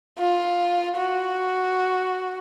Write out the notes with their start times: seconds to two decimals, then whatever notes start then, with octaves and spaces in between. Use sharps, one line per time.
0.19 F4
0.97 F#4